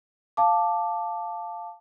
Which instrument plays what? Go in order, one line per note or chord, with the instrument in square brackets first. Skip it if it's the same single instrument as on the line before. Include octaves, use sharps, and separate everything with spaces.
[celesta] F5 A5 D6